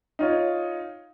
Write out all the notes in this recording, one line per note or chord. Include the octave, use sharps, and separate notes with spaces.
D#4 F4 C#5